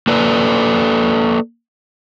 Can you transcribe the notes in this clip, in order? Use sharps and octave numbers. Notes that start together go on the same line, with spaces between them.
A#3 A4 B4 D5